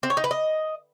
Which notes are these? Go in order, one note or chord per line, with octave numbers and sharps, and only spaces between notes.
C4
C#5
D#4
B4
D#5